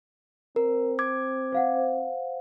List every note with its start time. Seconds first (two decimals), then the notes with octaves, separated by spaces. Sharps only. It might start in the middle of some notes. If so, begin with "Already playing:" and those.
0.56 C4 A#4
0.99 D6 G#6
1.52 C5 F5 F#5